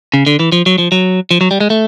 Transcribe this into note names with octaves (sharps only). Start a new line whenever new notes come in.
C#3
D3
E3
F3
F#3
F3
F#3
F3
F#3
G3
G#3
A3